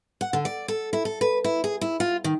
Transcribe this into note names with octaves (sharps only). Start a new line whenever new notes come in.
F#5
D3
D5
A4
E4
A4
B4
E4
G#4
E4
F4
D#3